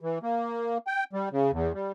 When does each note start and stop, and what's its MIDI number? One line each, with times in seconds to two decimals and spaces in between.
0.01 0.19 52
0.23 0.78 58
0.87 1.04 79
1.13 1.29 55
1.32 1.51 49
1.52 1.73 40
1.74 1.92 55